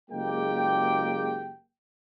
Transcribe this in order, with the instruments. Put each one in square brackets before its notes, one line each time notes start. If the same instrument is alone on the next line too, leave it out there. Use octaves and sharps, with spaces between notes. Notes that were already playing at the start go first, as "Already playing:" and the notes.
[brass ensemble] F#1 G#3 A#3 G4 G5